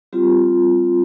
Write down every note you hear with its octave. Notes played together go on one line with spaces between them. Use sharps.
G3 C4 F4 G4